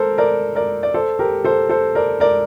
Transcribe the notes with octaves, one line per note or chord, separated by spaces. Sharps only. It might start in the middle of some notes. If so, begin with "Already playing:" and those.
Already playing: A4 A#4 C5
A#4 D5
A#4 D5
D5
A4 C5
G4 A#4
A4 C5
A4 C5
A#4 D5
A#4 D5